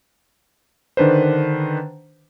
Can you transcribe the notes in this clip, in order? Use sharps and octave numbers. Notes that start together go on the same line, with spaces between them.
D3 D#3 D4 B4 C5